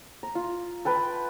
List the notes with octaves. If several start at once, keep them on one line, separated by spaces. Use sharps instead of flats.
A#5
F4
B4 G5 A5